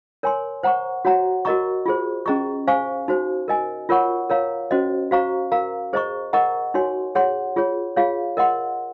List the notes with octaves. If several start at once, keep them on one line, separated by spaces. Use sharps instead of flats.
A#4 C#5 G#5 C6
C5 F#5 A#5 C#6
F#4 C#5 F#5 A#5
F#4 A#4 D#5 A#5 C#6
F4 G#4 C5
C#4 G#4 D#5 A#5 C#6
C5 F5 G#5 C#6
D#4 F#4 C5
A#4 D#5 G#5
F4 A#4 C#5 F#5 C#6
A#4 C#5 F5 A#5
C#4 F#4 C5 D#5
F#4 C5 F5 A#5 C#6
A#4 F5 A#5
G#4 C5 D#5 A#5 C#6
A#4 D#5 F#5 A#5 C#6
D#4 F#4 C#5 G#5 C6
G#4 C#5 F#5 C6
F4 G#4 C#5
F4 G#4 C#5 F5
A#4 D#5 F#5 C6